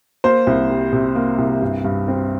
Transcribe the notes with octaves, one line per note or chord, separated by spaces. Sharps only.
A#3 C5
C2
G3
C3
A#3
C2
G2
G2
C4